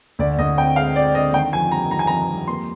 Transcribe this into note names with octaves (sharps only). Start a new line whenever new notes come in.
D2 D5
D2 D#5
C4 G5
G#3 F5
C4 D5
D3 D#5
D#3 G5
F2 G#5
G3 A#5
D#3 A#5
G#5
F2 A#5
G3
A#3 C6